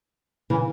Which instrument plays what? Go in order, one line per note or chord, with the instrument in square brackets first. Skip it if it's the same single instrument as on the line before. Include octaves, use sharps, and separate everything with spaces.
[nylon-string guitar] C#3 E3